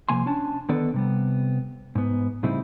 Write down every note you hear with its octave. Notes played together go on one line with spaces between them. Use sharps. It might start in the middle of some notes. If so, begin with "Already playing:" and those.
C3 F3 A#3 G#5 C6
C#4 D4 A5
D3 D#3 B3 A4 B4 D5
C3 G3 B3
G#2 B3
A2 C#3 G3 C4 D#4 E4